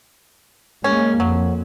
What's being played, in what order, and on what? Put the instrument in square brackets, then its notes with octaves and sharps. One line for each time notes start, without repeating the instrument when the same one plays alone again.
[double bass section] G#3 A#3 [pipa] C#4
[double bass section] F2 [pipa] F#3